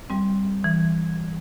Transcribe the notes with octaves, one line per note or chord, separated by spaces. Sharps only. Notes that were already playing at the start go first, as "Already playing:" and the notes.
G3 C4
E3